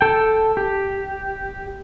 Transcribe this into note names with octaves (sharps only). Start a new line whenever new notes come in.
A4 G5
G4